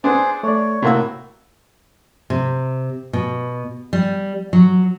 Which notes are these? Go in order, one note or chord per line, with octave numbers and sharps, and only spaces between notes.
B3 D4 G#4 C5
A3 C#5 D5
A2 C3 A#3 F#4 E6
C3
B2
G3
F#3